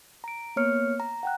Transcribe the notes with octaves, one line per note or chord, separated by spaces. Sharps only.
A#5 D7
A#3 B3 C#5 F6 C#7
A#5
F#5 G5 F#6